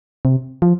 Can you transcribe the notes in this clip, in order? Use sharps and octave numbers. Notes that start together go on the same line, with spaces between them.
C3
F3